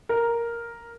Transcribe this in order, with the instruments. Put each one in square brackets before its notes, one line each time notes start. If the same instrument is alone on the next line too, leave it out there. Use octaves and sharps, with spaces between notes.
[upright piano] A#4